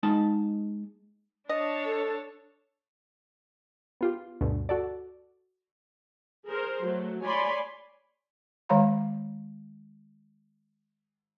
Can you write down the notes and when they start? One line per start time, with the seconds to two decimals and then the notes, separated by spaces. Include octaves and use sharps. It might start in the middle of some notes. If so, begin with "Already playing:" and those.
0.03 G#3 D#4 A5
1.49 D4 C#5 D#5 A5
1.85 A4
4.01 B3 F4 G4
4.41 D2 G2 B2 D3
4.69 F#4 A4 D5
6.48 G#4 A#4 C5
6.83 F#3 A3
7.23 C#5 D5 G#5 B5 C6
8.69 D#3 G#3 C#5 F5 A#5 B5